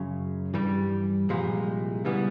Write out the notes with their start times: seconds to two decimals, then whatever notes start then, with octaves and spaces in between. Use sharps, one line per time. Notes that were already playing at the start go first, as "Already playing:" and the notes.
Already playing: F#2 C#3 F#3
0.54 G2 E3 G3
1.29 C2 A#2 F3 G#3
2.05 C#3 E3 G3 B3